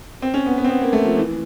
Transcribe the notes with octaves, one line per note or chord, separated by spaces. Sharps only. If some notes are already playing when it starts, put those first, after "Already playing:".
C4
C#4
B3
B3
C4
B3
A#3
A3
F3
E3